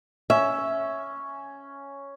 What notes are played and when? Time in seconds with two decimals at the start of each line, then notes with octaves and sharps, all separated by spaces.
0.30 C#4 E5